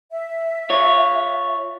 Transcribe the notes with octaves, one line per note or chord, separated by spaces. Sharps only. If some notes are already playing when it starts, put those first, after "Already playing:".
E5
F4 C#5